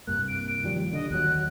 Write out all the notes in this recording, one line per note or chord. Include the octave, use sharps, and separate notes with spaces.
C2 G2 A#3 F#6
D7
D#3 F3 G3
D3 D#5
D#2 F#3 F#6